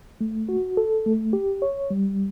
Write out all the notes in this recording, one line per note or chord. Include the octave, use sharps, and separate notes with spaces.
A3
F#4
A4
A3
G4
C#5
G3